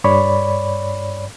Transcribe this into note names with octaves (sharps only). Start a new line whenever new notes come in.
G2 C#5 D5 B5